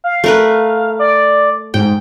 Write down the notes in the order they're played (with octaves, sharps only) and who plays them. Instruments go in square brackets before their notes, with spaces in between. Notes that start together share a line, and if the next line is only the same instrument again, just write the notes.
[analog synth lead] F5
[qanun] A3 A#4 B4
[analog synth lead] D5
[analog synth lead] G#2 [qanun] G5